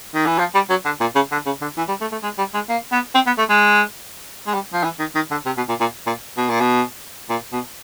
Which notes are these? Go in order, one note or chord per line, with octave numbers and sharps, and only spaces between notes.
D#3
E3
F3
G3
F#3
D3
A#2
C#3
D3
C#3
D3
E3
G3
A3
A3
G#3
G3
G#3
A#3
B3
C4
B3
A3
G#3
G#3
G3
F3
E3
D#3
D#3
D3
C3
B2
A#2
A#2
A#2
B2
A#2
B2
A#2
B2